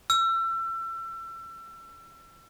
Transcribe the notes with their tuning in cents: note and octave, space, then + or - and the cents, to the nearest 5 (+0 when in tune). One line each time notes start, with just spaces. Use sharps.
E6 +30